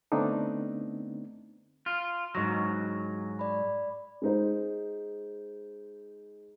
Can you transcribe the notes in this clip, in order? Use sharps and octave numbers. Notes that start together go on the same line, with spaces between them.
D3 A3 B3 C4 D4 D#4
F4
G#2 F#3 D#5 C#6 A#6
D5 B5
G#3 D#4 C5